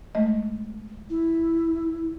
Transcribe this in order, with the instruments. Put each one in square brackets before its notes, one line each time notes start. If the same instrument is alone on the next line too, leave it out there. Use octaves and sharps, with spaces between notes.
[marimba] G#3 A3 D#5
[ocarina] E4